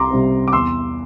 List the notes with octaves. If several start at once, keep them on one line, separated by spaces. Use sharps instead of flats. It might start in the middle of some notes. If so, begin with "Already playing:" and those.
Already playing: C2 A#5 C6 D6
C3 G3 C4
D6
E2 C6 E6